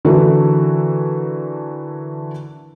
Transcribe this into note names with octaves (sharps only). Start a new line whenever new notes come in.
D3 E3 A3 F#4 A4 A#4